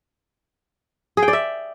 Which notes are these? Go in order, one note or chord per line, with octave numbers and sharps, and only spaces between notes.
G#4
G5
D5
E5